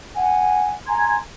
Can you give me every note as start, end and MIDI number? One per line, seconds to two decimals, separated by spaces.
0.15 0.73 78
0.15 0.73 80
0.87 1.19 80
0.87 1.19 82
0.87 1.19 84
0.87 1.19 92